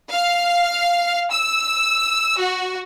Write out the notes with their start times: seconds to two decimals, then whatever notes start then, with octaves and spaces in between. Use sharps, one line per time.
0.11 F5
1.32 E6
2.40 F#4